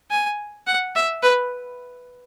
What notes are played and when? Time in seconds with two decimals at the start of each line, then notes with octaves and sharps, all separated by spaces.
0.11 G#5
0.67 F#5
0.96 E5
1.23 B4